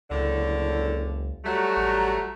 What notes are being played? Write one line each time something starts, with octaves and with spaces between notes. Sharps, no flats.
F#1 C#2 A2 D3
F#3 G3 A3 F#4 A#5
A1